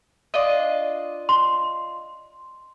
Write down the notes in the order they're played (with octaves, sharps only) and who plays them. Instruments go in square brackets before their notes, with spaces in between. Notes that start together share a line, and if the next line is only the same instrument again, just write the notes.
[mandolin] D4 F4 D#5
[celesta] C6